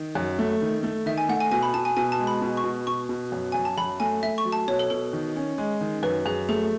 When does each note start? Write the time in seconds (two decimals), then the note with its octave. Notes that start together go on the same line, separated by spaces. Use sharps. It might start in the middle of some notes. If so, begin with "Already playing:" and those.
Already playing: D#3
0.15 F#2
0.39 A3
0.62 D#3
0.83 A3
1.06 D#3 E5
1.18 G#5
1.29 A3 F#5
1.40 G#5
1.51 B2 G#5
1.63 B5
1.74 B2 A5
1.85 G#5
1.97 B2 G#5
2.12 A5
2.19 G#3
2.27 B5
2.42 B2
2.57 C#6
2.64 B2
2.87 B2 C#6
3.09 B2
3.32 F#2
3.52 F#2 G#5
3.65 A5
3.77 F#2 B5
4.00 A3 G#5
4.23 A3 E5
4.38 C#6
4.45 F#3
4.52 A5
4.68 B2 C#5
4.79 A4
4.90 B2 A4
5.13 D#3
5.36 C#4
5.58 G#3
5.81 D#3
6.03 F#2 B4
6.26 F#2 G#4
6.49 A3 G#4